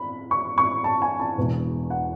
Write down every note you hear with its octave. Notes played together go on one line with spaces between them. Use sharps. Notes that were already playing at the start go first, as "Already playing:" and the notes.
Already playing: B5
C#6
C#6
A5
G#5
A5
E1 E2 B2
F#5